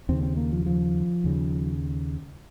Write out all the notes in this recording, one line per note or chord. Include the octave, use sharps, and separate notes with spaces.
D#2 C#3 C4
C4
A#3
F3
F3
D#2 C#3